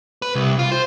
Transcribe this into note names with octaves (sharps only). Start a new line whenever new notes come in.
B4
C2
F4
C5